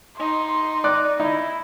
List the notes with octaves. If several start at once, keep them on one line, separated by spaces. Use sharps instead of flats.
D#4 C6
D5 F#6
D#4 E4